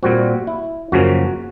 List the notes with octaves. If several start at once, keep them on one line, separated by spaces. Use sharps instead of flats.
A#2 G3 C4 F#4
E4
F#2 C#3 F3 A#3 C#4 F#4